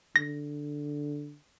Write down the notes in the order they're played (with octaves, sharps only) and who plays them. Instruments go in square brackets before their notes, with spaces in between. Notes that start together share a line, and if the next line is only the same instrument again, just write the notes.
[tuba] D3 [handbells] A#6